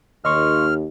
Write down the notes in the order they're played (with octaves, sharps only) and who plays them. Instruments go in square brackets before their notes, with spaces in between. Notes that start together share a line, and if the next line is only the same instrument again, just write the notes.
[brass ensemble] D#2 [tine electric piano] D#5 C6 C#6 [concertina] F6